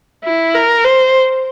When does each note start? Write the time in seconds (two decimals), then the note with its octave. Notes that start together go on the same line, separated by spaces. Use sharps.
0.25 E4
0.55 A#4
0.85 C5